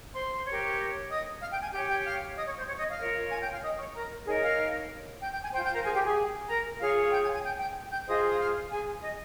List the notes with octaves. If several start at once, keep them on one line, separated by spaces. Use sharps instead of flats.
C5 C6
G4 A#4 C#5
D#5 D#6
F5 F6
G5 G6
G#5 G#6
G4 C#5 G5 G6
G5 G6
F5 F6
D#5 D#6
C#5 C#6
C5 C6
C#5 C#6
D#5 D#6
F5 F6
F4 A#4 C#5
G#5 G#6
G5 G6
F5 F6
D#5 D#6
C#5 C#6
A#4 A#5
D#4 G#4 A#4 C#5 G#5
F5 F6
G5 G6
G5 G6
G#5 G#6
F4 C5 G5 G6
G5 G6
A#4 A#5
G#4 G#5
G4 G5
G#4 G#5
A#4 A#5
F4 G#4 C#5 F5 F6
G5 G6
G#5 G#6
G#5 G#6
G5 G6
G5 G6
G5 G6
F4 G#4 C5 D#5 D#6
D#6
F5 F6
G#4 G#5
D#5